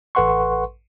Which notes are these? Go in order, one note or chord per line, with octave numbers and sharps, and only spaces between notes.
A1 A4 B4 F#5 C6 C#6